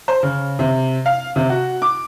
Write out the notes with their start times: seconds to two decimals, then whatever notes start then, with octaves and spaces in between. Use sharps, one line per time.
0.08 C5
0.23 C#3
0.59 C3
1.06 F5
1.36 C3
1.50 F#4
1.82 D6